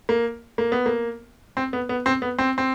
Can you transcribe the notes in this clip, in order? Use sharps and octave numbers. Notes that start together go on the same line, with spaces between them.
A#3
A#3
B3
A#3
C4
B3
B3
C4
B3
C4
C4